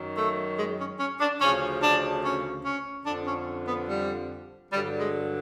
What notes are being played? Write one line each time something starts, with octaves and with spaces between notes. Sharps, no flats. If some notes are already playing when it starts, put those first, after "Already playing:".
Already playing: F#2 D#3 F#3
A3
G#3
C#4
C#4
D4
D2 C#3 F3 C#4
D4
C#4
C#4
F2 D3 F3 D4
C#4
B3
G3
G2 D3 F#3 G3
G#3